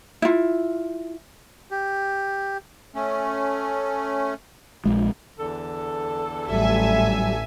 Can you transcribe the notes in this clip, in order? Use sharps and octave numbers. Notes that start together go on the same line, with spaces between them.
E4 F4
G4
A3 C#4
A#1 G#3
E2 D3 A4
A1 F#3 G3 E5 G#5